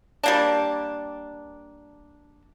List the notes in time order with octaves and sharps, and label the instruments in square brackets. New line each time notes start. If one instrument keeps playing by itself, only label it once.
[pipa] G3 A#3 D4